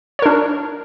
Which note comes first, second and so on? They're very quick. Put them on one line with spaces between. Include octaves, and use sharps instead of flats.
C#5 A#4 D4